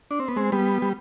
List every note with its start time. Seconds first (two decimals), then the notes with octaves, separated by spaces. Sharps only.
0.11 D4
0.20 C4
0.28 B3
0.36 G#3 C4
0.52 G3 B3
0.82 G3